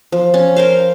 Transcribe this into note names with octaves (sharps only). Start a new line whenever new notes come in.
F3
C#4
A#4 C5 F5